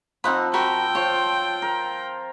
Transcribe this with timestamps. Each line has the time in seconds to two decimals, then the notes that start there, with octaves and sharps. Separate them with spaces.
0.24 F3 C4 D#4 F#5 B5
0.54 F#4 A#4 G5 B5
0.95 F4 C5 C#5
1.62 A#4